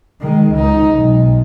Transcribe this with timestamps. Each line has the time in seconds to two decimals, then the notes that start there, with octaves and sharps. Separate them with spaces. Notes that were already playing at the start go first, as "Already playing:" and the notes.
0.21 D#3 G#3
0.52 C#2 D#4
0.94 B1